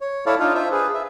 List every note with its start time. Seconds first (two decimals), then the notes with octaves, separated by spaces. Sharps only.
0.01 C#5
0.26 E4 A4 C#5 D5 F5
0.40 D4 D#4 F4 F5
0.54 F4 C5 E5
0.72 G#4 B4
0.94 E5